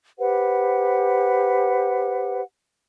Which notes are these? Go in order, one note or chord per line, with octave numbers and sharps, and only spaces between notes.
G4 B4 C5 F#5